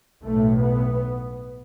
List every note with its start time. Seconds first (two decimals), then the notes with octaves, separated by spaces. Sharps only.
0.23 B1 A2 A3
0.60 B3